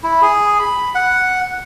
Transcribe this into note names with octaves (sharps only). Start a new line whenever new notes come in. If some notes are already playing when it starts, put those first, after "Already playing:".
E4
G#4
B5
F#5